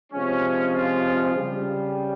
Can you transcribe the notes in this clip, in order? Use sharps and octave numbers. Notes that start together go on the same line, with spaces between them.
C3 F3 G#3 C#4
F4
C#3 G3